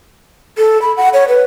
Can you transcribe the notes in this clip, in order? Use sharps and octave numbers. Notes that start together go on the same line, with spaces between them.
A4
B5
F#5
C#5
B4